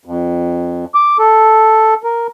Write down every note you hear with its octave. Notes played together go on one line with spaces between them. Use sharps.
F2
D6
A4
A#4